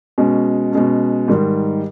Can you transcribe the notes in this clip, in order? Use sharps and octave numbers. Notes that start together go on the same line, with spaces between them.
B2 G#3 C#4
B2 G#3 C#4
G#2 D#3 G3